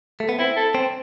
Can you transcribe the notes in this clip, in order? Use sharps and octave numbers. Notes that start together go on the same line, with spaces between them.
A3
B3
C4 E4
A4
C4